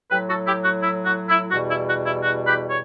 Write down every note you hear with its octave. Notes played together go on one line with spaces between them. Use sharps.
A2 F#3 G4 B4
F#4 A4
E4 G4
F#4
E4
F#4
E4
E2 B2 G3 F#4
E4
F#4
E4
F#4
G4 B4
C#5